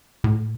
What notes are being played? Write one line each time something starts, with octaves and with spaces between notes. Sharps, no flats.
A2